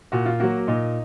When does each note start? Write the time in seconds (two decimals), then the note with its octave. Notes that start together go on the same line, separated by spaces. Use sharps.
0.12 A#2 F#4
0.26 F4
0.40 F#3 A#3 F#4
0.68 A#2 D#4